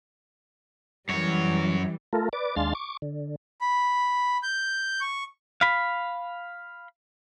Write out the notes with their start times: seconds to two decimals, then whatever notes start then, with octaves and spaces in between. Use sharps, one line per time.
1.09 F#2 E3 G3 C#5
2.13 A3 F4 A4 A#4
2.33 B4 D5 D6
2.56 D#2 G#3 D4 F5 C6 A6
2.75 C#6 D6
3.02 D3
3.61 B5
4.43 G6
5.01 C#6
5.61 F5 B5